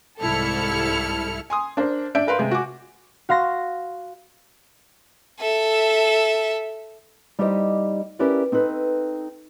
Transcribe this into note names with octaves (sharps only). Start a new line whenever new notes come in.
C2 G#2 E4 A4 F6 C#7
G#5 C6 D#6
D4 A#4 C5
D4 D5 E5 G6 D7
A#4 B4 F5 C6
C3 G#3
F#4 G#5 D6
F#4 F5 C6 A#6
A4 E5
G3 D#4 E4 G4 C5 D#5
C#4 E4 G4 A#4 B4 D5
C4 D#4 A4 B4